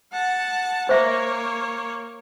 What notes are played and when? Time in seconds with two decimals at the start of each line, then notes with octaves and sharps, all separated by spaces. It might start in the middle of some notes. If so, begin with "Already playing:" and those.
0.12 F#5 A5
0.89 A#3 C5 C#5 E5